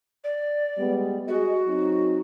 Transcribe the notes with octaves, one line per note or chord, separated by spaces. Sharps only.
D5
G3 G#3 B3
F#4 G#4 D#5
F#3 C4 D#4